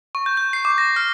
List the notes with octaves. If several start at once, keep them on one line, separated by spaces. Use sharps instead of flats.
C#6
G6
G6
C7
D6
A#6
F6